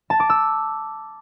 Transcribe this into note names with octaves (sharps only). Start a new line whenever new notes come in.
A5
D6
E6